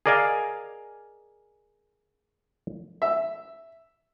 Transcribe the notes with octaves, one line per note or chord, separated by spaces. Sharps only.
G#4 A#4 D5 D#5 F5 G#5
E5